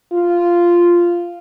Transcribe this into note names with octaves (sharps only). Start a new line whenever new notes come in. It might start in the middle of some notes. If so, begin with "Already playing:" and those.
F4